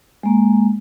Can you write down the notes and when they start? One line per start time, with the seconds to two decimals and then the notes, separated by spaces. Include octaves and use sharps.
0.23 G#3 A#3